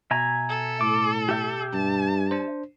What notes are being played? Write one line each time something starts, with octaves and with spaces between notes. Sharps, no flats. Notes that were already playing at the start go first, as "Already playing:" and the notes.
B2 E5 G#5 A#5
A4
A2 D6
G4 E5 G5
G2 A5
D4 C5